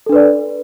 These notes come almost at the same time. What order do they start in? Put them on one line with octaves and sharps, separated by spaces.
A4 D4 B4 D5